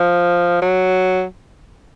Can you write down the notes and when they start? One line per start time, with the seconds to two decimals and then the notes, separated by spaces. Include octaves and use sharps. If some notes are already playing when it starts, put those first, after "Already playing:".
Already playing: F3
0.62 F#3